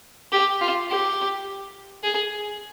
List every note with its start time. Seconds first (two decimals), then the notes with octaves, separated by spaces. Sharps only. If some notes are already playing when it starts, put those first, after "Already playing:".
0.32 G4
0.61 F4
0.90 G4
2.04 G#4